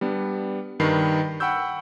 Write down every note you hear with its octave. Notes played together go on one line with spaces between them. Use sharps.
G3 B3 D4
G2 D#3 B4 B5 C7
F#5 G5 B5 C#6 E6 G6